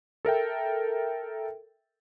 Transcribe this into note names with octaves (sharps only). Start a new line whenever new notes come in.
A4 A#4 E5 G5